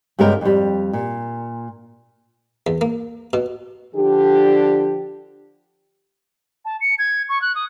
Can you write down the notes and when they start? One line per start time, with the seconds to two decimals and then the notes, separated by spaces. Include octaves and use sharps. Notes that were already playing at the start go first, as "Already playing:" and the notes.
0.19 G2 C#3 G#3 B3 A#4 G5
0.41 F2 G3
0.93 A#2
2.67 E2
2.81 A#3
3.33 B2
3.95 D3 F3 D4 G4
6.65 A5
6.81 C#7
6.99 G#6
7.29 C#6
7.42 F#6
7.55 D#6